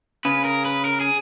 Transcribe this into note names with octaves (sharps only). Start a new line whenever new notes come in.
C#3 B4
A#4
B4
A#4
G#4